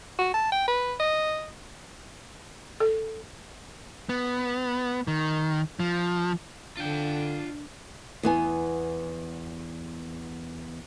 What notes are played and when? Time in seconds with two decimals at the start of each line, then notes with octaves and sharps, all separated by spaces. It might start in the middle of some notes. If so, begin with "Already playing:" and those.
0.19 F#4
0.34 A5
0.52 G5
0.68 B4
1.00 D#5
2.80 A4
4.09 B3
5.08 D#3
5.80 F3
6.77 D3 D4 F4 G5
8.23 E2 B3 G#5